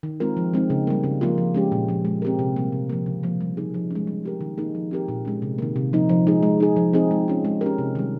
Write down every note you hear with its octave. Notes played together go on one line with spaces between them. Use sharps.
D#3
G#3 C4 F4 A#4
F3
G#3 C4 D#4
C#3
G3 A#3
C#3
F3 A#3 F4
F3
G#3 C#4 G4
A#2
F3 A#3
G#3
C4 G4 A#4
C3
G3 A#3
C3
F3 A#3
C#3
F3 A#3
G3
A#3 D#4 G#4
F3
G#3 C#4
G3
C4 G4 A#4
D#3
A#3 D#4 G#4
F3
C4 G4 A#4
A#2
G#3 C#4
C3
D#3 A#3
C3
F3 A#3 D#4
F3
G#3 D#4 G#4
G#3
D#4 G#4
F3
C4 D#4 G#4
G#3
C#4 F4
G#3
C#4 G4 A#4
C3
D#3 G3